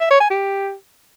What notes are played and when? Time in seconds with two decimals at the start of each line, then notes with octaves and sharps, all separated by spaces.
0.01 E5
0.10 C#5
0.20 G#5
0.30 G4